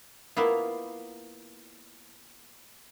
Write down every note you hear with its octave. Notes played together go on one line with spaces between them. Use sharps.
A#3 B3 E4 F4